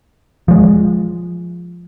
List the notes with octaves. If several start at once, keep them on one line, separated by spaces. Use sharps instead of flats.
F3 G#3